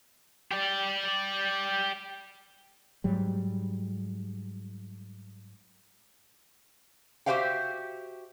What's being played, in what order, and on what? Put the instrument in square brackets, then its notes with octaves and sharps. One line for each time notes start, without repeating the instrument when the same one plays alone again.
[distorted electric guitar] G4 D5
[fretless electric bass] G#2 F#3 G3
[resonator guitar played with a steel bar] F#4 G4 C5 E5 F5 G5